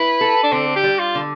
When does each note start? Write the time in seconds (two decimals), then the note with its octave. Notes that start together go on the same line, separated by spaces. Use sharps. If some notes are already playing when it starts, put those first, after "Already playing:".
Already playing: E4 B4
0.21 A4
0.43 D4
0.52 D3 C4
0.76 G4
0.83 G3
0.99 F4
1.15 D3